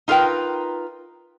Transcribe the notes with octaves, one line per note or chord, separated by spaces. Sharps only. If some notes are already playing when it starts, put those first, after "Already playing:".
D#4 F4 A#4 B4 G5